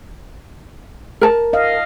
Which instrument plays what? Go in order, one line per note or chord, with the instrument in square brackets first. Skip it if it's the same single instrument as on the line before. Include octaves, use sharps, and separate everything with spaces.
[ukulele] A#4 A5
[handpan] D#5 F5